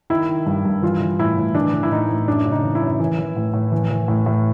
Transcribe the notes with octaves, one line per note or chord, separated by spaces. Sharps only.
D#3 E4
D#3
G2
G2
E3 F4
E3
A2 E4
A2
E3 D4
E3
E4
A2 D#4
A2
F#2 D4
C#3
D#4
E3
E4
F#2
E3
E3
A2
A2
E3
E3
A2
A2